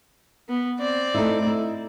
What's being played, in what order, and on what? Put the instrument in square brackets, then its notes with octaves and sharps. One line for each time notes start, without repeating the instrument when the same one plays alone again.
[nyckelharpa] B3
C4 D5
[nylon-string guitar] A3 D#4 E4
D#4 E4